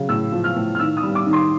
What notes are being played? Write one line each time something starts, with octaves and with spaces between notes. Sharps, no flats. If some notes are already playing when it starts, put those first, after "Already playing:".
Already playing: C#3 F#3
A2 E6
F3
F6
A2
F6
D#3 E6
D#6
G3
D6
D#3
C6